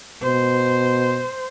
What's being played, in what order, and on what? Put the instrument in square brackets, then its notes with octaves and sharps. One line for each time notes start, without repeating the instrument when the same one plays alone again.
[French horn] B2 [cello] C5